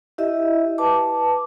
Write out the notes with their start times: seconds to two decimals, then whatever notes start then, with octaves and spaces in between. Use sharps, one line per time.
0.18 E4 G4 D#5 E5
0.78 B4 A5 D6